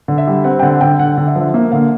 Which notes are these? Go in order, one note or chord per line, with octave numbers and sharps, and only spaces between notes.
D3
E5
G3
C4 F#5
G5
D3 F#5
D3 G5
D3 F#5
D3
E5
F3
E5
A#3 E5
D3 F5